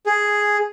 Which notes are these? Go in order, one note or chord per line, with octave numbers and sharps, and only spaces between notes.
G#4